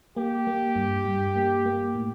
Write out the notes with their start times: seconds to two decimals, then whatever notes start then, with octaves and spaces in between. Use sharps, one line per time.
0.17 A#3 G4
0.47 A#3
0.76 G2
1.06 G2
1.36 A#3
1.66 A#3
1.95 A2